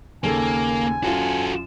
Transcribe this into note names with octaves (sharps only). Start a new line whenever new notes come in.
D#2 C#3 A#3 A4 G#5
F#2 F4 F#4 A4